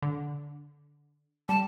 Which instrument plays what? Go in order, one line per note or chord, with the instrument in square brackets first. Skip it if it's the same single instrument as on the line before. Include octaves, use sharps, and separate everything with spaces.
[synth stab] D3
[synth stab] G3 [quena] A5